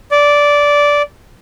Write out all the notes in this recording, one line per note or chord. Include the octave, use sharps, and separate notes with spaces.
D5